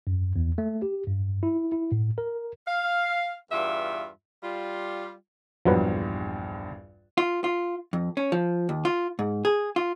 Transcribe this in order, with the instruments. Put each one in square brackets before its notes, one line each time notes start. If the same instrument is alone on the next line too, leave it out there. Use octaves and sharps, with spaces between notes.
[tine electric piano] F#2
E2
A3
G4
G2
E4
E4
A2
A#4
[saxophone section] F5
E2 G2 F4 E5
G3 F4
[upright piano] A#1 E2 G2 [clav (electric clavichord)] F3 F#3 B4
[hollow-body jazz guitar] F4
F4
F2
C#4
F3
D#2
F4
G#2
G#4
F4